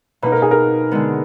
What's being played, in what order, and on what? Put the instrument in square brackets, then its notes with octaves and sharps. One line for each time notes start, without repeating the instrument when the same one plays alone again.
[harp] B2 A#3 D#4 [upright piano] B4
[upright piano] A#4
G#4
A#4
[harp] D3 G#3 B3